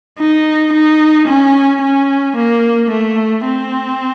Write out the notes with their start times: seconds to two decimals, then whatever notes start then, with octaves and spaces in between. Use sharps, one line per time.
0.18 D#4
0.73 D#4
1.27 C#4
1.82 C#4
2.36 A#3
2.90 A3
3.44 C4